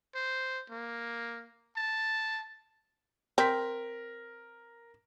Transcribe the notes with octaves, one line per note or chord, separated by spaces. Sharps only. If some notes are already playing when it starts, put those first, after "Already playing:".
C5
A#3
A5
C4 A#4 B6